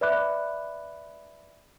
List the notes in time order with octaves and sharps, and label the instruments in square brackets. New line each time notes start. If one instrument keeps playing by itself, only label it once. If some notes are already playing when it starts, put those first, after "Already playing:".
[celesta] B4 D5 E5 B5 D6 F#6